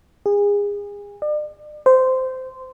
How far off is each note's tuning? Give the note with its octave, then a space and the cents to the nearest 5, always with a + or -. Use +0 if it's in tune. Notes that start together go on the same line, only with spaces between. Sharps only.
G#4 -30
D5 +40
C5 -15